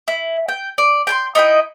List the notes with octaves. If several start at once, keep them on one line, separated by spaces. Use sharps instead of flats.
E4
G5
D5
G5 G#5 C6
D#4 E4 D#5 G5